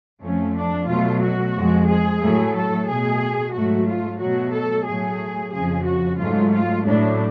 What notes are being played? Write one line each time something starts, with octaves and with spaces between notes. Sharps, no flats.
F2 F3 A3 C#4
D4
B2 F#3 A3 F4
F#4
F2 F3 G#3
G#4
A2 F#3 A3
A4
B2 A3 G#4
G#2 F#3 A3 F#4
F4
B2 F#3 A3 F#4
A4
A2 F#3 A3 G#4
F2 C#3 F3 G#4
F#4
G#2 F#3 A3 F4
F4
A2 F#3 A3 D4